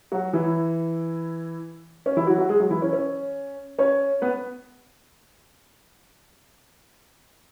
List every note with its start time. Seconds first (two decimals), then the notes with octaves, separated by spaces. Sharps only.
0.12 F#3 F#4
0.33 E3 E4
2.06 C#4
2.17 E3 E4
2.27 F#3 F#4
2.38 F#3 F#4
2.49 G#3 G#4
2.60 F#3 F#4
2.70 E3 E4
2.82 C#4
2.93 C#4
3.79 C#4 C#5
4.22 B3 B4